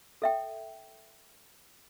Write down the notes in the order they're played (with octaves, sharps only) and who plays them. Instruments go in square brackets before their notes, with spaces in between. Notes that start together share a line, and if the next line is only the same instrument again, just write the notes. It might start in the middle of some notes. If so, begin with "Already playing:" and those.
[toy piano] A4 E5 G5